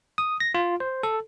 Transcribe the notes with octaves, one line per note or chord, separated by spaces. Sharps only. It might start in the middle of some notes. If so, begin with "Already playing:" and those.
D#6
A#6
F4
C5
A4